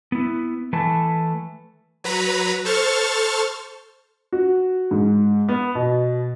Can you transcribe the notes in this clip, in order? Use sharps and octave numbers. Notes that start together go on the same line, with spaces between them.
B3 E4
E3 A3 B4 G#5 A5
F#3 B4 A#5 B5
A4 C5 C#6 F6 A6
F#4
G#2
B3
B2